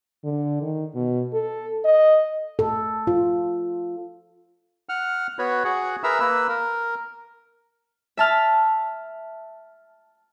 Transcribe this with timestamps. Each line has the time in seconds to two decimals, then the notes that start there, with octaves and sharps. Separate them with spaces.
0.24 D3
0.62 D#3
0.95 B2
1.33 A4
1.85 D#5
2.59 A4
3.07 F4
4.89 F#5 F6
5.39 B3 F#4 B4 C#5
5.65 F#4 G#4 F#5
6.04 G#4 A#4 B4 E5 A#5 E6
6.20 A#3 B4 E6
6.49 A#4
8.17 E5 A5 F6